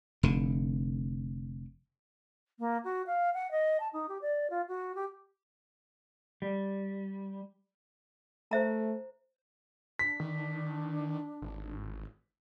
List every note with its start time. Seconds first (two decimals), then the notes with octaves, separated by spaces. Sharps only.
0.23 F1 D3
2.59 A#3
2.84 F#4
3.06 F5
3.33 F#5
3.51 D#5
3.80 A5
3.93 D#4
4.08 G4
4.21 D5
4.50 F4
4.68 F#4
4.95 G4
6.42 G3
8.51 A3 C5 E5 A#5
9.99 D4 B6
10.20 D#3
11.42 G#1